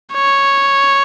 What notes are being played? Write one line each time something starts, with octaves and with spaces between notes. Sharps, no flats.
C#5